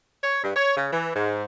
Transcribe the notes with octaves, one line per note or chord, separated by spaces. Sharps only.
C#5
G2
C#5
C#3
E3
G#2